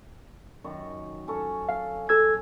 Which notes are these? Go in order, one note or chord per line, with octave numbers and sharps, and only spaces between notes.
F#2 D#3 C#6
C#4 A4 C#6
F5
A4 E6 G#6